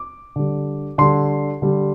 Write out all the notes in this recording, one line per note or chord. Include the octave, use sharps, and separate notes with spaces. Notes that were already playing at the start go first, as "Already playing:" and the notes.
Already playing: D6
D3 G3
D3 G3 C6
D3 G3